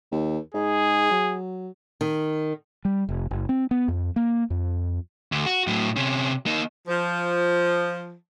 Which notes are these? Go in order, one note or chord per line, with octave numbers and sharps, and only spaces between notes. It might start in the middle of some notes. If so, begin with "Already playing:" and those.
D#2
G#2 G#4
F#3
D#3
G3
F1
F#1
C4
B3
F2
A#3
F2
D2
F#4
A2 F#3
C3 C#4
A#3 D#4
F3